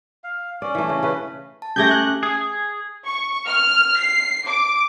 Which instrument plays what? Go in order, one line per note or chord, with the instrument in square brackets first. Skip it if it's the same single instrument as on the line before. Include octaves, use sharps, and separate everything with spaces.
[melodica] F5
[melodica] C#4 [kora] D5
[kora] E3 A3
C#3
C#3 B4
[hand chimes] A5
[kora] A3 G4 G#4 [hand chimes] C#4 D6 [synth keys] G6 G#6 A#6
[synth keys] F#6
[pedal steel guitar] G#4
[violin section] C#6
F6
C7
D6